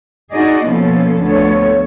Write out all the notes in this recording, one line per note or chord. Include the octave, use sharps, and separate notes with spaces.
D#4 F#4 G#4 D5 D#5
B2 F3 A#3 B3 C#4 A4
D2 D3 F3 B3 A4 C#5